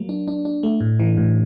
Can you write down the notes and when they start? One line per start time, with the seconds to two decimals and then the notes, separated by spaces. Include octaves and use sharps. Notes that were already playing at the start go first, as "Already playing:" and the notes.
Already playing: F#3 A#3
0.09 D4
0.28 D4
0.45 D4
0.63 A3
0.81 A2
1.00 E3
1.17 A2